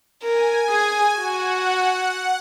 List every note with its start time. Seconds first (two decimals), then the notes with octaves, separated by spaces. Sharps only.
0.22 A#4 G#5
0.69 G#4
1.18 F#4 F#5